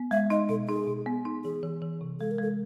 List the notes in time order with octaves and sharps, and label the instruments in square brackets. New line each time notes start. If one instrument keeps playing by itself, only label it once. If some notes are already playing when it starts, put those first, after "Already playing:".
Already playing: [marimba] B3
[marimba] G#3 [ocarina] E5
[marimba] D#4 [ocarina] D#5
[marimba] B2 [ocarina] A4
[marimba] D#4 [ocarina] G#4
[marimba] B2
B3
D#4
[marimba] E3 [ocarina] G#4
[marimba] E3
E3
C3
[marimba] G#3 [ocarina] A4
[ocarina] A#4
[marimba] G#3 [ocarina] A4